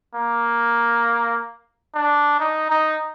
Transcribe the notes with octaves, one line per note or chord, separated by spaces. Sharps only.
A#3
D4
D#4
D#4